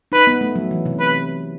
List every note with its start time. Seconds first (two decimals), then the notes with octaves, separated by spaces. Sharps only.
0.12 D#4 B4
0.27 B3
0.41 A3
0.56 F#3
0.71 E3
0.85 C3
1.00 B4